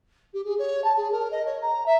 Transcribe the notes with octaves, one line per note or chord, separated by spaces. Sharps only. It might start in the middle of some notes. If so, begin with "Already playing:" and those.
G4
G#4
C#5
A5
G#4
A#4
D#5
C#5
A#5
E5